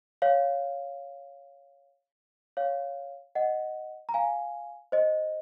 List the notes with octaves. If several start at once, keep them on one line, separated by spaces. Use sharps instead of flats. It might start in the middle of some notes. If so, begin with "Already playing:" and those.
C#5 F5
C#5 F5
D#5 F#5
A#5
F5 G#5
C5 D#5